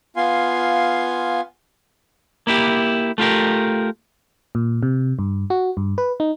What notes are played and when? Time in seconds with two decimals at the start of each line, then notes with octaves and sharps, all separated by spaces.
0.16 B3 F4 F5 G#5 C6
2.47 A#3 E4 G4
3.18 A3 F4 G4 A#4
4.55 A#2
4.83 C3
5.19 G2
5.50 F#4
5.77 G2
5.98 B4
6.20 D#4